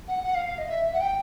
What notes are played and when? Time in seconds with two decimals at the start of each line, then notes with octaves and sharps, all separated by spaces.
0.08 F#5
0.24 F#5
0.35 F5
0.47 F5
0.58 D#5
0.69 E5
0.85 E5
0.93 F#5
1.00 G5